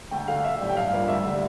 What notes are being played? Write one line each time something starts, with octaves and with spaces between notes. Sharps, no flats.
D2 G5
D3 A3 D4 F5
A#1 E5
A2 G3
G5
G2 F5
F3 A#3 D4
D2 E5
D3 G3